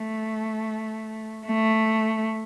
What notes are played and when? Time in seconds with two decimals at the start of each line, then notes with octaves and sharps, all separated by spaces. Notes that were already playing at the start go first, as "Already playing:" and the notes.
Already playing: A3
1.46 A3